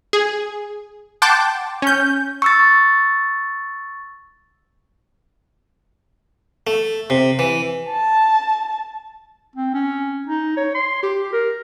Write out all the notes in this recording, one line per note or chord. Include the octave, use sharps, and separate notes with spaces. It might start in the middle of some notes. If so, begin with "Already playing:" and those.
G#4
F#5 G5 A5 C6 D6
C#4 G6
C#6 E6 A6
A3
C3
E3
A5
C4
C#4
D#4
C#5
C6
G4
A#4